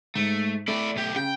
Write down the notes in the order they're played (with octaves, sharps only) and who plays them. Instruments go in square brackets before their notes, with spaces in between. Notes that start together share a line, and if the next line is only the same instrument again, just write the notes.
[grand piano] G#2 [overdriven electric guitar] A3
[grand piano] A3 [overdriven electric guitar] E4 D5
[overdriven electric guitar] B1 G4
[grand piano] C#3 [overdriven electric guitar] G5